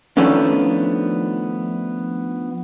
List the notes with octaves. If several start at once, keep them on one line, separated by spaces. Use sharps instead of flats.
D#3 F3 A3 B3 C#4 D4